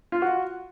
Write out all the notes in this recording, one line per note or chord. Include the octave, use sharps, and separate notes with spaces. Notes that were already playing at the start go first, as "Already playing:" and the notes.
F4
F#4